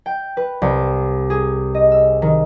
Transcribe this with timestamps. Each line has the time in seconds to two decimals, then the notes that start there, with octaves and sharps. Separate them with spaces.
0.06 G5
0.37 B4
0.62 C2
1.30 G#4
1.75 D#5
1.92 E6
2.22 D#3